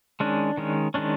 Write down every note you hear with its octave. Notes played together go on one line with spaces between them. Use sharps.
D#3 G#3 C#4 D4
D#3 G#3 C#4
D#3 G#3 C#4 D4